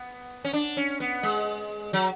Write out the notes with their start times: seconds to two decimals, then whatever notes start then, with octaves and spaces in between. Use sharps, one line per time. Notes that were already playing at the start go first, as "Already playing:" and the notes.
Already playing: B3
0.44 C#4
0.53 D4
0.77 C#4
1.00 B3
1.23 G#3
1.93 F#3